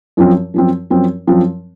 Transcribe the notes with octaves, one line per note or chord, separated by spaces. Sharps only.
F#2 F3 C4
F#2 F3 C4
F#2 F3 C4
F#2 F3 C4